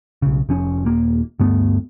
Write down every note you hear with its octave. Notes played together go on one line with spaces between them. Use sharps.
B1 C#3
F1 F3 C#4
D#1 A#3
D2 G2 A3 B3